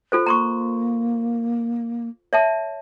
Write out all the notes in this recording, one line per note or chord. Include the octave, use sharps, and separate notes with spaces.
F4 A4 C5
A#3 A#5 C6 C#6
C#5 E5 A5